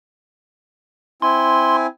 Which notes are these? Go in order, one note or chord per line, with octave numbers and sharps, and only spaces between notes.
C4 E4 G#5 C6